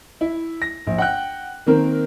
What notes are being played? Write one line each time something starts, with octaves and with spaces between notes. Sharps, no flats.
E4
A#6
A#1
F#5 G5 F#6
D#3 A#3 C4 A#4